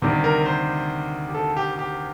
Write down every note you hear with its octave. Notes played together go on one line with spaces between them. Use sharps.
D2 C3 D#3 G3
A#4
C5
G4
A4
G4
G4